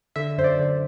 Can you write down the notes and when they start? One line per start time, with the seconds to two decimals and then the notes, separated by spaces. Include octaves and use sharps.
0.16 D3 E5
0.38 F#2 C5
0.44 D5
0.59 D3